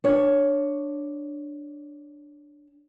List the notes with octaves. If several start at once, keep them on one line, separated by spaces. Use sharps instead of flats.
D4 C#5